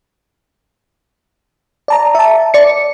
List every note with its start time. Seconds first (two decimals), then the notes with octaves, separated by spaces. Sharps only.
1.88 D5 A5 A#5
2.15 E5 A5
2.54 D5 C#7